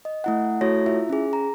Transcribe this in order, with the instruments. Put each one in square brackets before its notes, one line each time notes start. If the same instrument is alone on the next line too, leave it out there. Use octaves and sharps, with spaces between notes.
[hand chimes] D#5
A3 E4 F#5
A3 E4 F#4 A4 C#5 A#6
E4 F4 E5
C#4 G#4
A#5